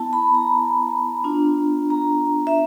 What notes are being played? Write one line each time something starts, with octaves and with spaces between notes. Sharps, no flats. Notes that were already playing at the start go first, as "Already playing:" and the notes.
Already playing: B3 E4 A5
B5
A#5
B3 D4 F4
A#5
E5